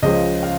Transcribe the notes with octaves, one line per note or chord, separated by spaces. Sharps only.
C#2 C#3 F3 D#5
F5